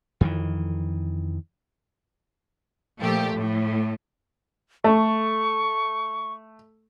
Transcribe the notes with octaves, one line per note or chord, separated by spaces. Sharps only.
F2 D#3 E3
A#2 F3 A3 G4
A2
A3 C#6